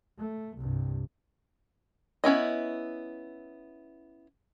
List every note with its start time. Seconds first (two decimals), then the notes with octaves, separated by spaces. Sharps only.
0.18 A3
0.57 C2 G2
2.24 B3 C#4 E4 D#5